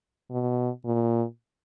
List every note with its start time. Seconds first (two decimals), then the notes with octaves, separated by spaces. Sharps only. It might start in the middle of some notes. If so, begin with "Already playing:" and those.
0.31 B2
0.85 A#2